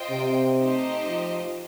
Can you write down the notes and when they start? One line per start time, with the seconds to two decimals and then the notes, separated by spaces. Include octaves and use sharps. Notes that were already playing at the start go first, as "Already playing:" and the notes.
Already playing: F4 C5 D#5 G5
0.11 C3
0.59 A3 D#4 G4 C5 D#5
1.08 F3